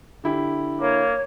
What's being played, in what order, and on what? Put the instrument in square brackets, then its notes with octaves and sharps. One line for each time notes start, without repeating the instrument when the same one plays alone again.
[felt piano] D3 E4 G4
[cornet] A#3 [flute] C#5